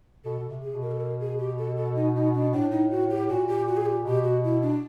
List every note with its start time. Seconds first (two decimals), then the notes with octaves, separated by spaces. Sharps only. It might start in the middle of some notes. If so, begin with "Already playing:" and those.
0.25 B2 A4
0.39 B2
0.49 C3
0.62 G#4
0.75 B2
0.82 A#4
0.91 A4
1.01 A#4
1.20 G#4
1.39 G4
1.58 A4
1.77 A4
1.96 D#4
2.15 D#4
2.34 D4
2.53 A2 D4
2.71 D#4
2.91 F#4
3.10 G4
3.29 A#2 F#4
3.48 G4
3.68 F#4
3.77 G#4
3.86 G4
4.05 B2 G4
4.24 F#4
4.44 E4
4.62 D4